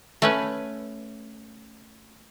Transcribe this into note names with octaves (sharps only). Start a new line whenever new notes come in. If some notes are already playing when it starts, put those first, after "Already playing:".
A3 C#4 B4